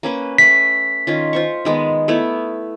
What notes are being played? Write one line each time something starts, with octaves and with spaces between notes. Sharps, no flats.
A#3 C#4 B4
A3 B4 B6
D#3 C#4 F4
F4 C5 C#6
D#3 G#3 B3
A3 B3 E4